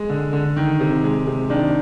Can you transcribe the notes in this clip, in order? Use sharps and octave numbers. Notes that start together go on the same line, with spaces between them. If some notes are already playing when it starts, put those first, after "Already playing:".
Already playing: G#3
D3
D3
D#3
C3
G#3
C3
D#3 D4